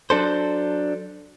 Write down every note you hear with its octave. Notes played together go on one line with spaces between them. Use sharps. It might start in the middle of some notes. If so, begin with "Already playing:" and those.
F#3 D4 A4 C5